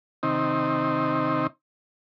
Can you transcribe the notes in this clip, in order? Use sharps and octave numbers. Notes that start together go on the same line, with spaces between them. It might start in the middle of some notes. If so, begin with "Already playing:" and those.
C3 D#3 C4 D#4